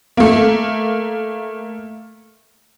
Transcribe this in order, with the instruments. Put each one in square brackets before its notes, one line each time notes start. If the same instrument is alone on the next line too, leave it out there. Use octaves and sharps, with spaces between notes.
[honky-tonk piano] A3 A#3